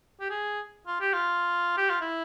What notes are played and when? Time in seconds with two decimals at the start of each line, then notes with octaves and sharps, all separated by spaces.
0.21 G4
0.30 G#4
0.87 F4
1.01 G4
1.14 F4
1.77 G4
1.90 F4
2.01 E4